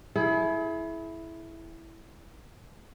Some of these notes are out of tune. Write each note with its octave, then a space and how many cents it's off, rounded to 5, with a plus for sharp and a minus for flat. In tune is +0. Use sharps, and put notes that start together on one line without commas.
E4 +0 G#4 +40